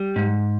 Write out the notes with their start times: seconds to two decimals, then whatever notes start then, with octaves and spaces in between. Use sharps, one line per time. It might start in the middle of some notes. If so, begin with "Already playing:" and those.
Already playing: G3
0.16 G#2